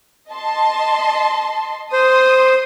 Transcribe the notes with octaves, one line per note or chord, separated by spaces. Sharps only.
D#5 A5 C6
C5 C6 D#6